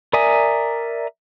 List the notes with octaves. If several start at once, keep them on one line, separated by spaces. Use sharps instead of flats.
A#4 D5 E5 G#5 D#6